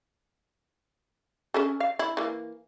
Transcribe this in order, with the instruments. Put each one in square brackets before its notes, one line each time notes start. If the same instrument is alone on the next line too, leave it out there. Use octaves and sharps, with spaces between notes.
[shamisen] C#4 G#4 A4
F5
E4
E3 A#3